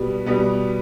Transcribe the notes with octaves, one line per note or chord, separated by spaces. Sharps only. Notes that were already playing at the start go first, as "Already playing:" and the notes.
Already playing: B2 G3 B3
B2 G3 B3